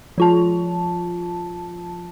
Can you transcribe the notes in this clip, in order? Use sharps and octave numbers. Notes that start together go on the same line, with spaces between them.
F3 F4 A5